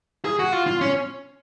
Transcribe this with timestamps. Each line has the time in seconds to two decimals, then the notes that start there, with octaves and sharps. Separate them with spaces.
0.25 G#4
0.39 F#4
0.52 F4
0.67 F4
0.81 C#4